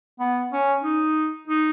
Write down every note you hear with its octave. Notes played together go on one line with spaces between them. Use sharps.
B3
C#4
D#4
D#4